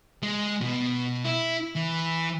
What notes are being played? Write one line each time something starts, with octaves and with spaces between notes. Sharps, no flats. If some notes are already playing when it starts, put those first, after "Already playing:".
G#3
B2
E4
E3